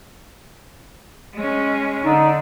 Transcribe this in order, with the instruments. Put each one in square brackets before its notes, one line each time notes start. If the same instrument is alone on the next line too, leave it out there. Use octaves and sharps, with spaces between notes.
[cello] G#3 C#4
[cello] D3 [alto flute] D#4